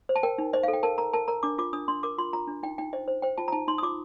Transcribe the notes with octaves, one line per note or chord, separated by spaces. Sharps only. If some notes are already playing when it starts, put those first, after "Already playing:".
C5
A5
A#4 G5
D#4
C5 D#5
A4 F5
G5
A#4 A5
A#4 A#5
A#4 A5
A#4 A#5
D4 D6
F4 D6
D4 D#6
D4 C6
A#4 D6
F4 C6
F4 A#5
D4
D#4 G5
D#4 G5
C5 D#5
C5
C5 G5
F4 A5
A#5
D#4 A5
D#4 C6
D#6
F4 D6